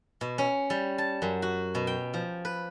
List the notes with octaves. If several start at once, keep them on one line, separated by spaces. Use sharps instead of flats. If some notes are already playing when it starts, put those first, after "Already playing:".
B2
C#4
G3
A5
F#2
F#4
B2
G5
F3
B4